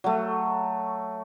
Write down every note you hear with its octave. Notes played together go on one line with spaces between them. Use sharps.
F#3 A3